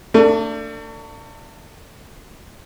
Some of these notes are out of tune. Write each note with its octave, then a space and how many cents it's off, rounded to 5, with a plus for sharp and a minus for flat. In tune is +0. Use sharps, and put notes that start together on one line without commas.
A3 +40 D4 +0